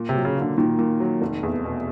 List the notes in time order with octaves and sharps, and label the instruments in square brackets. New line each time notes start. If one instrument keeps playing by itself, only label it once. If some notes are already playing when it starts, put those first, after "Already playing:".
Already playing: [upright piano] A#2
[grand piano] C3
[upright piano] F#3
[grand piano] C#3
[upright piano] A#3
[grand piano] D3
[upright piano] A#2 [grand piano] D#3
[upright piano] A#2
F#3
F1
E2
B2